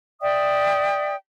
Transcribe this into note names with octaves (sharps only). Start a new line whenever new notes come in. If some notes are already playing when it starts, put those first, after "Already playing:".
D5 E5 G5 D#6